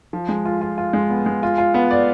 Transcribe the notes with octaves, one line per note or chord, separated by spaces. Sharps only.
F3
G#3
F4
F4
F4
G#3
B3
G#3
F4
F4
B3
D5